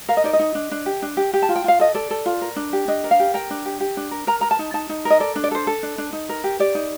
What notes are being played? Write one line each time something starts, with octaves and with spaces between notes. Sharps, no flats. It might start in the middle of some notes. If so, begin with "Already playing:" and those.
A#4 F5
D#5
D#4 D5
D#5
D#4
D4
D4
G4
D4
G4
G4
A5
F4
G5
F4 F5
A4 D#5
A4 D5
A4
F4
A#4
D4
G4
D4 D#5
A#4
F5
G4
A#4 G5
D4
G4
G4
D4
A#4
A#4 A#5
A#4 A#5
A5
D#4
D#4 A5
D#4
A#4
D#5
A4 D5
D4
D5
A4 C5
A4
D4
D4
D#4
A#4
G4
G4 D5
D#4